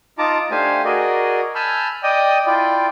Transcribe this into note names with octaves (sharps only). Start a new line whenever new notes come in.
D#4 F4 A5 A#5 D6
A3 D4 G4 C5 F5 G#5
F#4 G#4 A#4 D5 D#5
G#5 A5 B5 E6 F6 G6
D5 D#5 G5 D#6
E4 F4 D5 G5